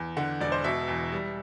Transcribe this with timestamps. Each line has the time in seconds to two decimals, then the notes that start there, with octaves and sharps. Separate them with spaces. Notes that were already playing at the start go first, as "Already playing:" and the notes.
Already playing: E2
0.17 D3 F#5
0.41 E1 D5
0.52 C5
0.64 B2 E5
0.88 E2
1.12 G3